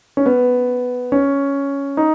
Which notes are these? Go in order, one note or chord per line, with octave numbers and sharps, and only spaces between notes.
C#4
B3
C#4
D#4